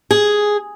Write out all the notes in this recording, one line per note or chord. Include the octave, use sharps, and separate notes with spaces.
G#4